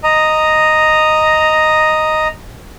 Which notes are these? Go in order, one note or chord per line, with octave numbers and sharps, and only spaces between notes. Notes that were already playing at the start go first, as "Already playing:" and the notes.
D#5 A#5